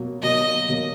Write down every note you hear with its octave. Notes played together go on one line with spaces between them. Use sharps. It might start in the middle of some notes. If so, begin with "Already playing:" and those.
Already playing: B2 F#3 A#3
B2 F#3 A#3 D#5
B2 F#3 A#3